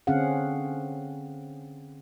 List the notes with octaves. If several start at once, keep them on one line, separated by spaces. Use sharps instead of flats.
D3 C4 C#4 G#4 F5 F#5